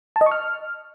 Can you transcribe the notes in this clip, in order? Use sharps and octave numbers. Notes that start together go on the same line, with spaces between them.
A5
D#5
C#6
F6